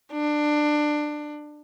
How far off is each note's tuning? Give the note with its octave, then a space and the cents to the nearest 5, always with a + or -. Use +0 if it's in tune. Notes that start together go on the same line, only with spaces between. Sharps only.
D4 +20